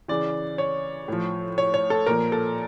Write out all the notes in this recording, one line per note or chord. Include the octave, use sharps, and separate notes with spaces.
C#3 E3 D5
C#5
A2 F3
C#5
C#5
A4
A#2 F3 A#4
A4